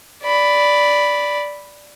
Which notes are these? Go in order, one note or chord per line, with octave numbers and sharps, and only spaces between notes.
D5 B5